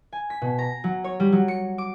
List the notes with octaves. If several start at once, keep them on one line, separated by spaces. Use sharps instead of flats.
G#5
B6
B2
A#5
F#3
C#5
G3
F#3
C#7
D6